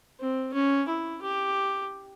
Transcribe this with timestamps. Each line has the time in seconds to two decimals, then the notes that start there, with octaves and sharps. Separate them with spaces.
0.20 C4
0.54 C#4
0.88 E4
1.22 G4